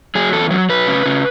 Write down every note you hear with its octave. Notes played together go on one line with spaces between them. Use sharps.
F#3 G#4
E2 A4
F#3
F#3 B4
C#3
C#3